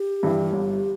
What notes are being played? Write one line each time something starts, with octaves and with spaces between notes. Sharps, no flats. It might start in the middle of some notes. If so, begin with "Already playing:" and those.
Already playing: G4
G2 E3 G3
G1